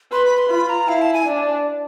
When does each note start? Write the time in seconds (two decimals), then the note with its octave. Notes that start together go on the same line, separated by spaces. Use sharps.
0.12 B4 C6
0.25 B5
0.38 C6
0.50 F4 B5
0.69 A#5
0.88 E4 F5
1.01 A5
1.13 G#5
1.26 D4